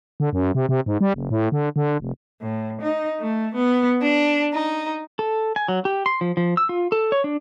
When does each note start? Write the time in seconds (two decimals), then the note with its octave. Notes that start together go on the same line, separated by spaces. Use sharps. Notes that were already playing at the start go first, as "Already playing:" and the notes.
0.20 D3
0.33 F#2
0.55 C3
0.69 C3
0.86 G#2
1.01 G3
1.14 F#1
1.30 A2
1.52 D3
1.76 D3
2.00 F1
2.42 A2
2.81 D#4
3.21 A3
3.55 B3
4.01 D4
4.55 D#4
5.19 A4
5.56 G#5
5.68 F#3
5.85 G4
6.06 C6
6.21 F3
6.37 F3
6.57 E6
6.69 F4
6.92 A4
7.12 C#5
7.24 D4